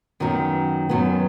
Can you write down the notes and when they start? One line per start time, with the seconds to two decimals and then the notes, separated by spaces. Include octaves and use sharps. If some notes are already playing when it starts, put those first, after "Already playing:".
0.20 F#2 D#3 F#3 B3
0.89 F#2 D#3 F#3 B3